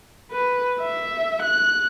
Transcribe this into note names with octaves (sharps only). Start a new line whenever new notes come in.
B4
E5
F#6